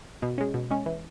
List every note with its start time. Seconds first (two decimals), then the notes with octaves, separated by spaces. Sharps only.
0.22 B2
0.38 G#3 C#4
0.54 B2
0.70 G#3 C#4
0.86 E3